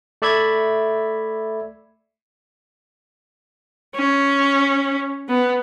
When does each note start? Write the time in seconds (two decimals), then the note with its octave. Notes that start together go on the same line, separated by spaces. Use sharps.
0.22 A3 D5 E5 B5 G#6
3.95 C#4
5.29 B3